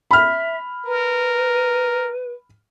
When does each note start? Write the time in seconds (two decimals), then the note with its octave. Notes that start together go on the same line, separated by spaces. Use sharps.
0.11 E5 B5 F6
0.85 A#4 B4